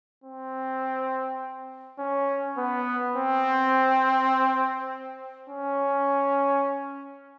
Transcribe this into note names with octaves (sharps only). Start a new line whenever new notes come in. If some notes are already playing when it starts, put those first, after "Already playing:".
C4
C#4
B3
C4
C#4